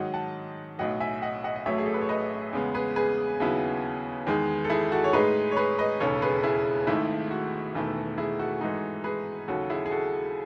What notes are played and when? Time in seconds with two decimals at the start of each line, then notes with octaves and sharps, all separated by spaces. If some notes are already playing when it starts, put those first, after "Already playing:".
Already playing: G#2 D#3 F#3 D#5 F#5
0.14 F#5 A5
0.79 B1 A2 F#3 D#5 F#5
1.00 E5 G#5
1.22 D#5 F#5
1.44 D#5 F#5
1.56 D#5
1.66 A1 A2 F#3 A3 C#5 E5
1.78 G#4
1.86 A4
1.94 B4
2.01 C#5
2.09 B4 D#5
2.53 E2 C#3 G#3 B3
2.74 G#4 B4
2.96 G#4 B4
3.40 D#2 C#3 F#3 B3 E4
4.27 E2 D#3 G#3
4.65 A4
4.70 E4 G#4
4.92 F#4 A4
5.04 C#5
5.13 A2 G#3 D#4 G#4 B4
5.51 C#5
5.57 G#4 B4
5.79 B4 D#5
6.00 E1 D#2 C#3 A4 C#5
6.22 G#4 B4
6.43 E4 G#4
6.87 G#1 G#2 D#3 A3 E4
7.31 F#4
7.74 E1 E2 D#3 A3 E4
8.18 E4 G#4
8.39 F#4 A4
8.61 G#2 E3 G#3 D#4
9.04 G#4 B4
9.48 D#2 C#3 F#3 F#4 A4
9.70 E4 G#4
9.86 G#4
9.91 F#4 A4